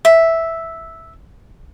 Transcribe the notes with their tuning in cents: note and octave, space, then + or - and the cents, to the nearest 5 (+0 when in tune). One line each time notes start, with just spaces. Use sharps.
E5 -5